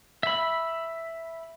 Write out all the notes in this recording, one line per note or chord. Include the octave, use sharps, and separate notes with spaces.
E5 B5